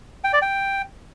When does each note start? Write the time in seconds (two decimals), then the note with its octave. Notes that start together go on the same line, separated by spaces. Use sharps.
0.24 G5
0.33 D5
0.42 G5